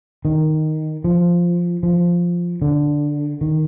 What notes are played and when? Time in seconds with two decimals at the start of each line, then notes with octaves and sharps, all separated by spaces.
0.25 D#3
1.04 F3
1.83 F3
2.62 D3
3.41 D#3